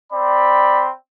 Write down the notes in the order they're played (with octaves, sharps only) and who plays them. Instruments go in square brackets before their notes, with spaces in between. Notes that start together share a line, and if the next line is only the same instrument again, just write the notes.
[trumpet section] C4 D5 B5